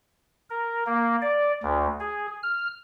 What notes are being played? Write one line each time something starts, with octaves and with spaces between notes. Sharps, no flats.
A#4
A#3
D5
D2
G#4
F6